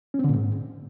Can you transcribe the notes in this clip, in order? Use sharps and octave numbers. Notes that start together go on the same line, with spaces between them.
C#4
C4
D3
A#2
G#2